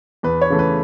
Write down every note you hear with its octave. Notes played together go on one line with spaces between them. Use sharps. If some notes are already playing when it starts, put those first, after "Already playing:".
E2 B4
C#5
C#3 E3 A3
B4